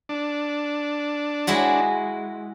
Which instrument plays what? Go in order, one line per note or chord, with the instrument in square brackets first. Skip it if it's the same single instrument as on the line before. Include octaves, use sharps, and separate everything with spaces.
[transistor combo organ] D4
[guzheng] G#3 E4 F#4